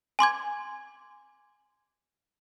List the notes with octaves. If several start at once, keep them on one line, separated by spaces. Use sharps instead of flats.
G#5 C6 D6 G#6